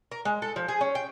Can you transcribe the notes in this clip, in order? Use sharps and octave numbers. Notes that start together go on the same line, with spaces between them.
A#4
G#3
A4
F3
G#4
C#4
G5